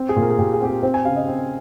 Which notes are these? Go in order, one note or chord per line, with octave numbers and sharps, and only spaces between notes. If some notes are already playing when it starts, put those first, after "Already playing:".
Already playing: C4
G#4
A#2
A#4
G#4
A#2 G4
G#4
C4 G4
G#4
C4 C5
G#5
C#3 F5
D#5
C4